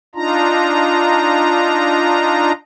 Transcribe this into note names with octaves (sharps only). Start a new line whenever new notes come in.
D4 D#4 F4 A#5